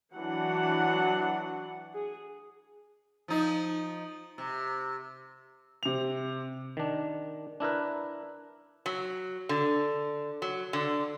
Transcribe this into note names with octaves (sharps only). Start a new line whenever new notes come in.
E3 F#3 D4 F#5
G#4
F3 D#4
C3
C3 F7
D#3 D4
D4 E4 A#4 B4
F#3
D3
F#3
D3